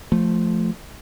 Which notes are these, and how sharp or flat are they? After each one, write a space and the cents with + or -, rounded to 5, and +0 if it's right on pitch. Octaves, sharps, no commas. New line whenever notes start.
F3 +0 A3 -5